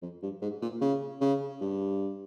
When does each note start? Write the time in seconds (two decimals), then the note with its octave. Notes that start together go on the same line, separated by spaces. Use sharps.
0.02 F2
0.23 G2
0.42 G#2
0.62 A#2
0.81 C#3
1.21 C#3
1.61 G2